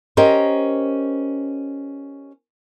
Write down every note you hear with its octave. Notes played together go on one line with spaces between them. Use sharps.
C#4 G4 A#4 C5 D#5